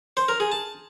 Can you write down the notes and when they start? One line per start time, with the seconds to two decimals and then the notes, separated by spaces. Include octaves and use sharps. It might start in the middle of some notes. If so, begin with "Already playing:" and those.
0.17 C5
0.28 A#4
0.40 G#4
0.52 A5